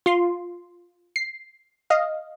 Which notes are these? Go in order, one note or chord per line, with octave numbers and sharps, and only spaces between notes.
F4 C6
C7
D#5 F5